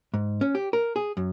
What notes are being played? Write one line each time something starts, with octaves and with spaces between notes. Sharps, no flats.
G#2
C#4
G4
A#4
G#4
F#2